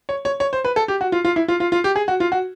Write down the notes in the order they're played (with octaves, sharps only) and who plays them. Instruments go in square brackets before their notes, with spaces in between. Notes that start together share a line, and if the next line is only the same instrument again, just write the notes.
[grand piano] C#5
C#5
C#5
C5
B4
A4
G4
F#4
F4
F4
E4
F4
F4
F4
G4
G#4
F#4
F4
F#4